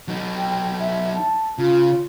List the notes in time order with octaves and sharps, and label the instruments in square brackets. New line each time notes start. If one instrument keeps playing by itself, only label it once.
[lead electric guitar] F#3 D#4
[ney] G5
E5
A5
[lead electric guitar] C#3 [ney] F4